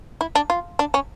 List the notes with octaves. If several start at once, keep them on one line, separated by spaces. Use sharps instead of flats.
E4
D4
F4
D4
C#4